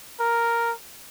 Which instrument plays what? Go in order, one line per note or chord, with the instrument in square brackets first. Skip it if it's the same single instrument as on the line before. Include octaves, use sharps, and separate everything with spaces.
[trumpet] A#4